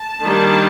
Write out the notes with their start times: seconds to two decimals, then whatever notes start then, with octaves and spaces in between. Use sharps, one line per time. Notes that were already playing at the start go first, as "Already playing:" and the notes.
Already playing: A5
0.23 D#3 G3 A#3 D4